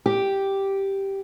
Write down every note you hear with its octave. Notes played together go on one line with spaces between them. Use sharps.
G4